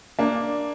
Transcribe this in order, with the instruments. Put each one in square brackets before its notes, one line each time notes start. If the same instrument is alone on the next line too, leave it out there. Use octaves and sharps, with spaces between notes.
[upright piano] A#3 D4